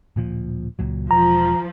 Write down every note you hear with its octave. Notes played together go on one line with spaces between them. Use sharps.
D1 A#2 F3
C#2 A#2 F#3
E1 F3 A#5